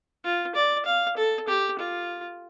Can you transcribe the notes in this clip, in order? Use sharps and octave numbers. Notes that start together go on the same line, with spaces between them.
F4
D5
F5
A4
G4
F4